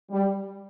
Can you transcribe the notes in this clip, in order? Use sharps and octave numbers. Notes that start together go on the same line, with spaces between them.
G3